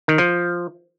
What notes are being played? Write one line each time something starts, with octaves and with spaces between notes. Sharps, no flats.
D#3
F3